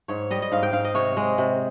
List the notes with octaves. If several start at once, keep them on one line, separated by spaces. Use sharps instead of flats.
G#2 C#5
G3 D#5
D#5
G#2 F5
G5
G#2 F5
D#5
C3 C#5
G#3
C3